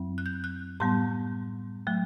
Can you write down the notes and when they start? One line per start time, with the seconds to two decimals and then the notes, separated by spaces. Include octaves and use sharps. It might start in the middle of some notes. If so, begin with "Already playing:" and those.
Already playing: F#2 F#3 C4
0.18 F#6
0.26 G6
0.44 F#6
0.80 A2 G3 B3 C6
1.87 F#3 A3